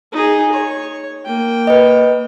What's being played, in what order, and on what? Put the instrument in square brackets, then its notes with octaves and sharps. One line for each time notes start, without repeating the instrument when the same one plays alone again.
[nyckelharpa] D#4 G#4
C#5
A#3 G5
[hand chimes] B4 D#5